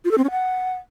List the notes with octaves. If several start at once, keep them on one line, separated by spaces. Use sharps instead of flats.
F4
A4
C4
C#4
F#5